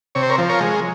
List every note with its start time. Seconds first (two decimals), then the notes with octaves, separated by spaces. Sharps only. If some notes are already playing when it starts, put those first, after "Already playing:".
0.15 C3 C#5
0.23 C5
0.30 A#4 C#5
0.38 F3
0.50 A#4 C#5
0.61 G#3